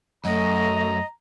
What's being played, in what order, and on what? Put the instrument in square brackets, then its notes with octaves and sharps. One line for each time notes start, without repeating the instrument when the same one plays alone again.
[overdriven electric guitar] F#2 [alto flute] A3 [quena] D#5 [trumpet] A#5